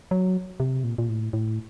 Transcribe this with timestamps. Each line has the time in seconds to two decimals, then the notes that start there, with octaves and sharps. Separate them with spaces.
0.11 F#3
0.60 C3
0.84 A#2
0.98 A#2
1.09 A2
1.33 A2